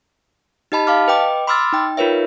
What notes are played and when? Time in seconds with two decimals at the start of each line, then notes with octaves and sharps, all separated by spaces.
0.72 D#4 G4 D#5 A5 B5
0.87 F5 A5 D6 F6
1.08 B4 D#5 G5 D6
1.47 B5 C6 D6 E6 F6 A6
1.72 D#4 G5
1.97 D#4 F4 A#4 B4 C#5 E5